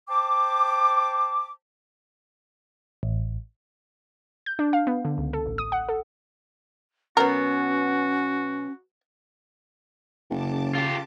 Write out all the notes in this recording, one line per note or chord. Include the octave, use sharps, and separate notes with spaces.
C5 G5 A5 D6
A1
G6
D4
F5
B3
D3
C#2
A4
A1
D#6
F#5
A4
B2 F#3 B3 C#4 F#4 A#4
F#1 C#3 A5 D6
F4 G4